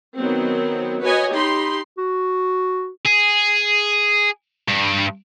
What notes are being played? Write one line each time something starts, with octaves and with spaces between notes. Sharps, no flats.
D#3 F#3 B3 C4
F#4 B4 C#5 D#5 G#5
D#4 G4 B5 C6
F#4
G#4
G2